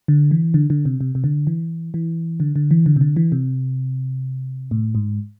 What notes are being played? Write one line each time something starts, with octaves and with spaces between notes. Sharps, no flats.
D3
E3
D3
D3
C3
C3
C3
D3
E3
E3
D3
D3
E3
D3
C3
D3
E3
C3
A2
G#2